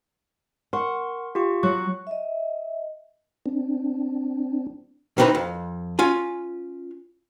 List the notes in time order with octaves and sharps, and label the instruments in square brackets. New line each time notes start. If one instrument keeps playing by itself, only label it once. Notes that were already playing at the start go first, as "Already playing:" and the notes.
[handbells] A#4 C6 C#6 [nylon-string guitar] F#5
[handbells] F4 G4 C#6
[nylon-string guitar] F#3 [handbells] C#6 F#6
[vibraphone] D#5 E5
[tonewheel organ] C4 D4
[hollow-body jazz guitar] D#3 E3 C4 D#4 B4
F2
C#4 F4 G#5